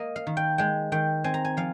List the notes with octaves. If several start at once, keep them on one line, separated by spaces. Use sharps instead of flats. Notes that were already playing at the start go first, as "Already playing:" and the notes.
Already playing: A#3 D#5
F5
D#3
G5
G#3 G5
D#3 G5
C4 G#5
A#5
G#5
F3 F5